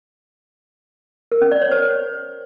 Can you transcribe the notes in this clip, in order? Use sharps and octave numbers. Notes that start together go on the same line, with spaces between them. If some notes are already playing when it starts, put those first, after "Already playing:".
A#4
C#4
D5
C#5
C5